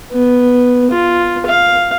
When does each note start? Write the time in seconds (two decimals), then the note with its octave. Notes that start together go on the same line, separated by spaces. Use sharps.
0.12 B3
0.91 F4
1.46 F5